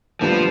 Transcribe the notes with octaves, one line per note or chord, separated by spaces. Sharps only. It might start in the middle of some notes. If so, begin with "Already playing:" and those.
D2 D3 F3 G3 B3 D4